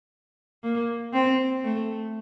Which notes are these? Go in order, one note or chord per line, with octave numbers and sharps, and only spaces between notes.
A#3
C4
A3